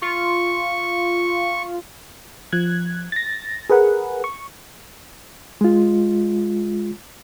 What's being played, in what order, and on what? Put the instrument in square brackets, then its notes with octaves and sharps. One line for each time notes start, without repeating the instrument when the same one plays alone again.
[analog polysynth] F4 [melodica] C#6
[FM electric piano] F3 F#6 G#6
A6 A#6
G#4 A#4 B4 F#5
C#6
[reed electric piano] G#3 F4